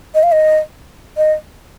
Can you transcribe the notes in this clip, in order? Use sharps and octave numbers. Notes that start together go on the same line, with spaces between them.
D#5
F5
D#5
D#5